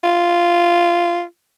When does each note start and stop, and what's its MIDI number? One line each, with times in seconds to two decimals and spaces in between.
0.04 1.23 65